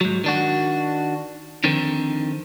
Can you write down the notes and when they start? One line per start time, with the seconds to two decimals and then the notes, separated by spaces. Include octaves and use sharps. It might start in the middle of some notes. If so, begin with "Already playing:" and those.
0.01 G#2 F#3
0.24 D#3 D4 F#4
1.64 F2 D3 D#3 C4